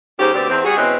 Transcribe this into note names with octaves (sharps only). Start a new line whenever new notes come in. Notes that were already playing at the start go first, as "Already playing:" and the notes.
D#2 G#2 C#4 G4 C5
D2 B2 C4 G4 D5
E2 C4
G3 F#4 G#4
B2 E3 G#3 C4 C#4 B4